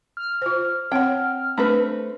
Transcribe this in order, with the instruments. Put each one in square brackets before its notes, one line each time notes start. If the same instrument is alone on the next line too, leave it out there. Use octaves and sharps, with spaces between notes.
[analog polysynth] F6
[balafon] F4 C5
[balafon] C4 C#5 F#5 [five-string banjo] G5
[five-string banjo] A3 C4 B4 [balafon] D4